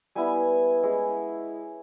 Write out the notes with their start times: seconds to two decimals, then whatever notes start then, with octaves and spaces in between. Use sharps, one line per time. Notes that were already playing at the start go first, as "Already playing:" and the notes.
0.15 G3 B3 E4 G#5
0.83 G#3 C#4 E4